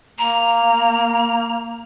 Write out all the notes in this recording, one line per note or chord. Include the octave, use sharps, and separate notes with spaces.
A#3 A#5